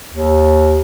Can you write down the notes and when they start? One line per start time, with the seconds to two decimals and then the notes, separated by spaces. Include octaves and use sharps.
0.14 D#2